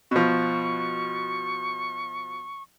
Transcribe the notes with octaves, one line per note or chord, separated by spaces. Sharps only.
B2 F3 C#6